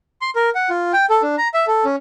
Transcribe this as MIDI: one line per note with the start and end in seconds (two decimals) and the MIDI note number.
0.22 0.30 84
0.36 0.50 70
0.55 0.69 78
0.70 0.92 65
0.93 1.06 79
1.10 1.22 69
1.22 1.36 62
1.38 1.48 82
1.54 1.65 76
1.67 1.85 69
1.85 1.96 61